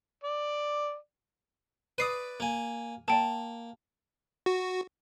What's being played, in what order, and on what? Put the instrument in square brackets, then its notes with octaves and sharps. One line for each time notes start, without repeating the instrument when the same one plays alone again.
[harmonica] D5
[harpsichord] B4 D5 [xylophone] D#6 C7 D#7
[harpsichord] A#3 G#5
[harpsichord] A#3 [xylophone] D5 G5 A5
[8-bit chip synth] F#4